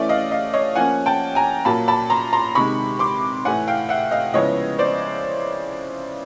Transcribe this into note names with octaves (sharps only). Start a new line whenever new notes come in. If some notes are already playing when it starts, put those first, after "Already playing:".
Already playing: E3 A3 C#4 D5 E5
D#5 F5
D#5 F5
C#5 D#5
F3 A#3 C#4 F#5 G#5
G5 A5
G#5 A#5
A#2 F#3 A#3 A5 B5
A5 B5
A#5 C6
A#5 C6
C3 D#3 G#3 B5 C#6
C6 D6
A2 E3 A3 F#5 G#5
F5 G5
E5 F#5
D#5 F5
C#3 F3 G#3 B3 E4 C#5 D#5
C5 D5